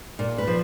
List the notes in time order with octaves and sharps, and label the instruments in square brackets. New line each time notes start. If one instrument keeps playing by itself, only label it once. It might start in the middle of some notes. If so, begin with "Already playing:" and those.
[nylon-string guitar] A#2
B4
F3